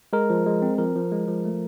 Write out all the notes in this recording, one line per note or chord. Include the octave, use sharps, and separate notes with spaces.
G#3 A#4
F3
G#3
C4
F3 A#4
F3
G#3
F3
A3